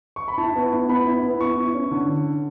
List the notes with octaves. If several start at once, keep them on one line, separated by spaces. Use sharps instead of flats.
C#6
B5
E4 A5
B3
E4
B3 B5
E4
B3
E4 C#6
E4
C#4
D3